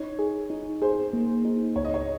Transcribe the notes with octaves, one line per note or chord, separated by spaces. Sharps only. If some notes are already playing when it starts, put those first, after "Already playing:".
Already playing: D#4 C#5
G#4
D#4
G#4 C5
A#3
D#4
C#2 C#5
D#5
C#5